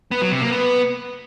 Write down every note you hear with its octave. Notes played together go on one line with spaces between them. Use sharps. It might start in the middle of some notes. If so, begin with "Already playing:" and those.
B3
F#3
C3
A#3
B3